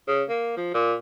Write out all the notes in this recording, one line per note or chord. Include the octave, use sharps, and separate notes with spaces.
C#3
A#3
F3
A#2